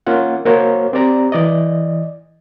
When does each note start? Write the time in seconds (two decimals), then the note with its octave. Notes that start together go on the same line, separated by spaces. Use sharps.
0.07 A#3 C#4 F4 F#5
0.45 A#3 F#4 A#4 C5 C#5
0.93 C4 G4 D5 A#5
1.32 E3 D5 D#5